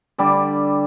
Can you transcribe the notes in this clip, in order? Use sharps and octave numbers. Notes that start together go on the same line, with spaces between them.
D3 G3 D5